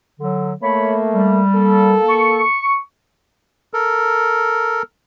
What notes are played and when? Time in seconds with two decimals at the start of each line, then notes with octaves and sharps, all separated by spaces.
0.20 D3 F#3
0.63 A3 A#3 C#5 B5
1.14 G3
1.55 A#3 A4
2.09 C#6
3.73 A4 A#4